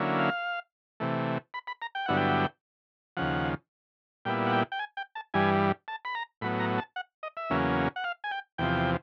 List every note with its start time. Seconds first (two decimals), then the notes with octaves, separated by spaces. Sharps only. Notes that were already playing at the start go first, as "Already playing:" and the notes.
Already playing: D3 F#3 A#3 C#4 E4
0.19 F5
1.00 C3 E3 A3
1.54 B5
1.67 B5
1.82 A#5
1.95 G5
2.06 G2 D3 F#3 B3 E4 F#5
2.17 G5
3.17 D#2 C#3 F3 F#5
4.25 A#2 G3 B3 E4 G5
4.47 F#5
4.53 G5
4.72 G5
4.79 G#5
4.97 G5
5.15 A5
5.34 G2 E3 G3 G#5
5.88 A5
6.05 B5
6.15 A#5
6.41 A2 F#3 B3 B5
6.60 A#5
6.78 A5
6.96 F#5
7.23 D#5
7.37 E5
7.50 E2 C#3 F#3 A#3 C#4
7.96 F#5
8.04 F5
8.24 G#5
8.31 G5
8.58 E2 C3 F3 G5